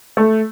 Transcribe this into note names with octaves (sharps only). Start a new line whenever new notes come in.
A3